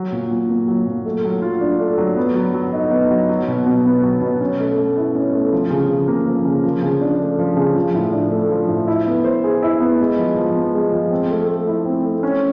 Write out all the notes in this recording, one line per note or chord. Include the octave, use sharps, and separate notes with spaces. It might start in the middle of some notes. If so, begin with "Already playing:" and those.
Already playing: F#3
A#2
A#2
A#3
F#3
A#2
A3
F#3
F4
D4
A3
F#3
B3
F#3
F#3
D#4
B3
F#3
F#3
B2
B2
B3
F#3
B2
C#4
A3
A3
E4
C#4
A3
F3
C#3
C#3
A#3
F3
C#3
F3
C#3
D4
A3
F3
C#3
F3
A2
D4
A3
F3
A2
E4
B3
C5
G#4
E4
B3
G#3
F3
F3
B3
G#3
F3
C4
A3
A3
E4
C4
A3
C#4